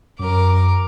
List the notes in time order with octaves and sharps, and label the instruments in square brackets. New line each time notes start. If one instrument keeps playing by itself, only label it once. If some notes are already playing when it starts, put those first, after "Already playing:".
[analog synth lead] F#2 [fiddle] A#4 D6